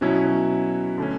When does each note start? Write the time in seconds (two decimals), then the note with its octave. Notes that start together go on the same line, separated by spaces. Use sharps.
0.01 B2 F#3 C#4 E4
0.98 D3 A3 C#4